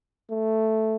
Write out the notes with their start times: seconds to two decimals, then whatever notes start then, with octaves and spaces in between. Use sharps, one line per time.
0.30 A3